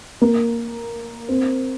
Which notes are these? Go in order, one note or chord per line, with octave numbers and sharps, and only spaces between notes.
A#3
C4